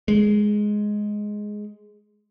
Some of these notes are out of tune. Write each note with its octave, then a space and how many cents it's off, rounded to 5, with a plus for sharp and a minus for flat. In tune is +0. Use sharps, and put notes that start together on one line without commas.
G#3 +5